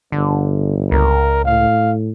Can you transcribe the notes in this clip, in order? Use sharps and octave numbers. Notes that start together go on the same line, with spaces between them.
G1 D3
C#2 A#4
A2 F5